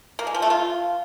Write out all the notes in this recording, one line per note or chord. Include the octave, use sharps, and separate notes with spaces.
A#3
G#3
F3
A3
F4